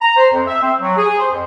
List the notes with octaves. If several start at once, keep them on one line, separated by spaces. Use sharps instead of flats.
A#5
C5
F2
E5
C4
F#3
G#4
C5
F2